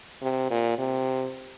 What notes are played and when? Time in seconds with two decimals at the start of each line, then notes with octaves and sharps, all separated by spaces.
0.22 C3
0.50 A#2
0.79 C3